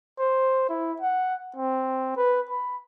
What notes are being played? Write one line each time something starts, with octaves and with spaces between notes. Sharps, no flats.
C5
E4
F#5
C4
B4
B5